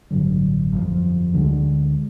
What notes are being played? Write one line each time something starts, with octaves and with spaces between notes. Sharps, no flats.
A1 G2 D3 F#3
G1 F2 C3 F3
D2 D3 F3 G#3